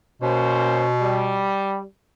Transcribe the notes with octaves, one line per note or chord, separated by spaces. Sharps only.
B2 A#3 C#4 C5
G3